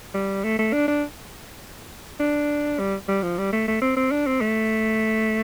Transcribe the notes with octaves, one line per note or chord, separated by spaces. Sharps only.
G3
A3
A3
D4
D4
D4
G3
G3
F3
G3
A3
A3
C4
C4
D4
C4
A3